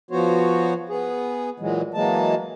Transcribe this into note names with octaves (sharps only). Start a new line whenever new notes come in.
F3 B3 F#4 C5 C#5
B3 G#4
A#2 E3 F#3 G#3
E3 F#3 G#3 A#3 A5